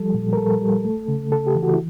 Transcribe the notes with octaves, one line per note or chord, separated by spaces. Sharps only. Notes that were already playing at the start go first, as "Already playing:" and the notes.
Already playing: F3 G3 A4
A#2
A#4
G3 A4
G3
A3
C#3
C#3 A4
G4
E3
F#4
E4